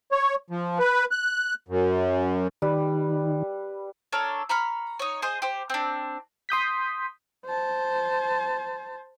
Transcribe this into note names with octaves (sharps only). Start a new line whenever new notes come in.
C#5
F3
B4
F#6
F#2
D#3 G3 B4
D4 A4 A#4 C#5
A#5 B5 C#6 F6
D#4 C#5
G#4 C5 D#5
G4 C5
C4 D4
C6 D#6 G6 B6
C5 A5